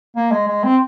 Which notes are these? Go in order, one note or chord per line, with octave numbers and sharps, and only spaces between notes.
A#3
G#3
G#3
C4